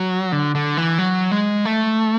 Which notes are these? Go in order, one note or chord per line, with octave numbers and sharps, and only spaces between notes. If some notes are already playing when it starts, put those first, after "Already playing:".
Already playing: F#3
D3
D3
E3
F#3
G#3
A3